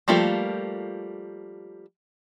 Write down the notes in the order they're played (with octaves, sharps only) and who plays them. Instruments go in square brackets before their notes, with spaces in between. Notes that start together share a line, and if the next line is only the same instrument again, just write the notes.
[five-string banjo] F3 G3 A3 A#3 F4